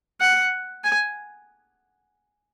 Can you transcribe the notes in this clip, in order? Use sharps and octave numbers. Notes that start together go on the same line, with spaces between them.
F#5
G#5